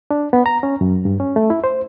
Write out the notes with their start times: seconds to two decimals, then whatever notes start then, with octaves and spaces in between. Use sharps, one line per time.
0.11 D4
0.33 B3
0.46 A#5
0.63 C#4
0.81 F#2
1.05 G2
1.20 C#4
1.36 A3
1.50 E4
1.64 C5